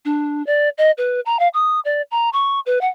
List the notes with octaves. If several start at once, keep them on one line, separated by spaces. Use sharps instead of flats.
D4
D5
D#5
B4
A#5
F5
D#6
D5
A#5
C#6
B4
F#5